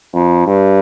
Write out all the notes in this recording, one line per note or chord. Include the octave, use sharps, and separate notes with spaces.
F2
G2